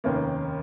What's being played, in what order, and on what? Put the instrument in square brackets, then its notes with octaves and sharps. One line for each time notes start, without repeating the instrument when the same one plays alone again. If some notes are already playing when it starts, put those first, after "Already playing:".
[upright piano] F1 D#2 D#3 A#3 C#4